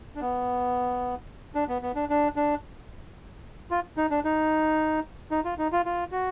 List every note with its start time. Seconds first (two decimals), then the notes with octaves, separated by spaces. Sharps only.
0.15 D4
0.21 B3
1.55 D4
1.68 B3
1.82 B3
1.96 D4
2.09 D4
2.36 D4
3.71 F4
3.97 D#4
4.10 D4
4.25 D#4
5.31 D#4
5.45 F4
5.58 D#4
5.72 F4
5.85 F4
6.12 F#4